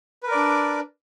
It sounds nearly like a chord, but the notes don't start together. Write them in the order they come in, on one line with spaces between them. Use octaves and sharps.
B4 A#4 D5 D4